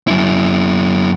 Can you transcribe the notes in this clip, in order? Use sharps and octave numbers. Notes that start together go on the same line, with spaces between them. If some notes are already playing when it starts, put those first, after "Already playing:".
F#2 E4